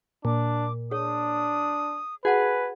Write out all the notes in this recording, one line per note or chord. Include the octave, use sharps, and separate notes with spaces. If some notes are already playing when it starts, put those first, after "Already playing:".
A#2 D4 D6
D4 G#4 C#5 D#6
F#4 G#4 B4 F#5 A5